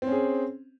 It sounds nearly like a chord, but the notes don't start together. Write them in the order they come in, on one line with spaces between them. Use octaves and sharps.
C4 C#4 G#4